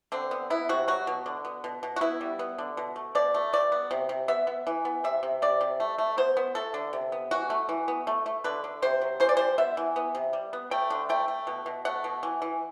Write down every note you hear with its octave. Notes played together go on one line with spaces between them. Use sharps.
D3 C4
B3
B3 E4
C3 F#4
F#3 F#4
B2
D3
B3
B2
B2
F#4
B3 E4
G3
B3
D3
B2
A3
B2 D5
A3
G3 D5
B3
C3
C3
B3 E5
B3
E3
B3
C3 E5
C3
C3 D5
C3
A3
A3
B3 C5
B3
A3 A4
D3
C3
B3
E3 F#4
A3
E3
B3
A3
A3
D3 B4
D3
C3 C5
F#3
E3 C5
D5
G3 C5
B3 E5
E3
B3
C3
G3
B3
A3 G5
D3
A3 G5
A3
B2
B2
A3 F#5
B2
E3
E3